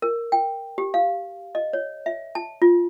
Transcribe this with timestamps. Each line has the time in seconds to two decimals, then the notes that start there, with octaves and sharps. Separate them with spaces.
0.02 A#4
0.32 G5
0.78 G4
0.94 F5
1.55 D#5
1.73 C#5
2.06 E5
2.35 A5
2.62 F4